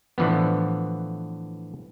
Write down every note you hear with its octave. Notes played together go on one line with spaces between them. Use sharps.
A2 D3 E3 F3 B3